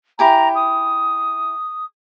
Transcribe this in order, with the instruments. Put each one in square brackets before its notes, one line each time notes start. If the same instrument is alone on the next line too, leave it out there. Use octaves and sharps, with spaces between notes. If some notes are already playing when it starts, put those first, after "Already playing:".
[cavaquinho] E4 G4 G#5 [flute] A#5
[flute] D#6